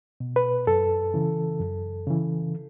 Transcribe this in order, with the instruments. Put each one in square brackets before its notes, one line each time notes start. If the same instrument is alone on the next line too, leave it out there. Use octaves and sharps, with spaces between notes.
[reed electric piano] B2
B4
F#2 A4
C#3 E3
F#2
C#3 E3